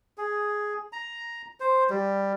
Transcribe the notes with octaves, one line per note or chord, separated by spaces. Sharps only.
G#4
A#5
C5
G3